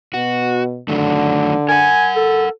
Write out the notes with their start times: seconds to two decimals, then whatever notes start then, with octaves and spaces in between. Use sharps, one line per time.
0.14 B2 F#4
0.89 D3 D#3 F#3 A3
1.69 A#4 F#5 G#5
2.16 A4